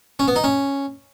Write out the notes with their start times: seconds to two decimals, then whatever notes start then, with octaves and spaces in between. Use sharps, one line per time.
0.19 C#4
0.28 B3
0.36 D#4
0.44 C#4